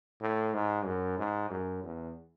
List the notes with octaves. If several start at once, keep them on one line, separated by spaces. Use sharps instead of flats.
A2
G#2
F#2
G#2
F#2
E2